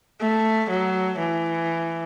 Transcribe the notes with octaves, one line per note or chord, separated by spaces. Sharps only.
A3
F#3
E3